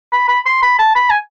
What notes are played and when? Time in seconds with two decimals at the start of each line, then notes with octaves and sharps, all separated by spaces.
0.13 B5
0.28 B5
0.46 C6
0.62 B5
0.79 A5
0.96 B5
1.10 G#5